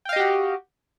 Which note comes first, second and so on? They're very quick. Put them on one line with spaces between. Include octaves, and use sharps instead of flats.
G5 F5 D#5 G4 F#4